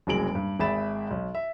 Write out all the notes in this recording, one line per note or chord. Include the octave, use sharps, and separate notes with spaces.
F#1 C2 F#3 G#3 D7 F#7
G2
G#1 G#4 E5 B5 A6 E7
B1
E5